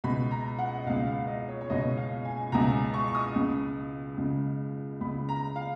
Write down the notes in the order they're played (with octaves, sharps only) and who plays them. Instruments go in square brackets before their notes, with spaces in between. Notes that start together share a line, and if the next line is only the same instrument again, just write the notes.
[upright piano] C#2 B2 B5
A#5
F#5
D#5
B2 F5
C#2
F5
D#5
C#5
C#5
C#2 B2 D#5
F5
G#5
C#2 B2 A#5
C#6
C#6
D#6
C#2 C#3
C#2 C#3
C#2 C#3 B5
A#5
F5